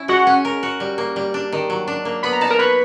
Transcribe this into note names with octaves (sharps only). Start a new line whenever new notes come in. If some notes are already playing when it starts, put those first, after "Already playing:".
Already playing: C#4 E4
G#3 F#4 F#5
C#4
A#4
F#4
G3
A#3
G3
D4
D#3
F#3
D4
A#3
B3 B5
A#5
D#4 A5
A#4 A#5
B4 C#5 B5